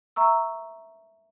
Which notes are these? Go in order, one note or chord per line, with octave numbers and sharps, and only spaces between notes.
E5 A#5 C#6 E6